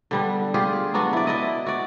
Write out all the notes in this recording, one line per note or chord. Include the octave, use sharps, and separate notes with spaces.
D3 G3 B3
F4 G4 G#4
F#3 B3 D4 F#4
E4 D5
E4 D5 D#5
F#4 D5